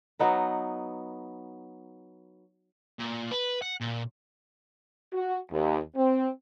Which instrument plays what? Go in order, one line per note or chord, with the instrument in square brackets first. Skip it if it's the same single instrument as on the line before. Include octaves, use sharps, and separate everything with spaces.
[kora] F#3 B3 D#4 B4
[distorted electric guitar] A#2
B4
F#5
A#2
[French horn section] F#4
D#2
C4